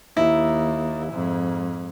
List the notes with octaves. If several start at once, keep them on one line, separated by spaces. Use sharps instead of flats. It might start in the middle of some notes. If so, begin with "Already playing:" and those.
D#2 E4
F2 G#2